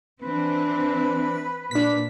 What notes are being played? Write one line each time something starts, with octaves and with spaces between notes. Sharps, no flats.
E3 C4 D4 B4
A#2 D4 B6